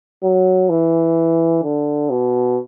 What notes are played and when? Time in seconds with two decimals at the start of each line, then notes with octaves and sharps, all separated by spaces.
0.23 F#3
0.70 E3
1.64 D3
2.10 B2